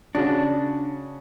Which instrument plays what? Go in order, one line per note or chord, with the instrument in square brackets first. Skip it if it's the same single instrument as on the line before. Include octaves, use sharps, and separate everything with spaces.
[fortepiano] C#3 F#4 [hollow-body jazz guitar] D4